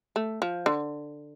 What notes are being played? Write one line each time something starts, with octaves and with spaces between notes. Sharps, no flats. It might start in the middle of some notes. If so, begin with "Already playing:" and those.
A3
F3
D3